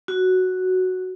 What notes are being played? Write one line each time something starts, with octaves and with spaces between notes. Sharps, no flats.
F#4